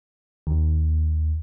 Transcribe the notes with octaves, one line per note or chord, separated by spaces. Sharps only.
D#2